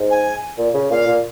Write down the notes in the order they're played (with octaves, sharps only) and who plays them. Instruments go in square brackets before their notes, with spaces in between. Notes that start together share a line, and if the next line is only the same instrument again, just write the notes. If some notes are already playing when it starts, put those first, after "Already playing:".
Already playing: [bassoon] G#2
[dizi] G#5
[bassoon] A#2
C#3
[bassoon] A#2 [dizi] F5
[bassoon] A#2